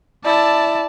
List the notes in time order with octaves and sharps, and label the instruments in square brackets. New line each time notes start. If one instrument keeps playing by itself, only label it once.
[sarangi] E4 [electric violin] D5 A5